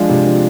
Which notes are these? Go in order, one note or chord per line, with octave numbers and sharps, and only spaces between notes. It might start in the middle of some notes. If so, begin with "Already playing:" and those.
Already playing: F3 G#3 D4
C3
F3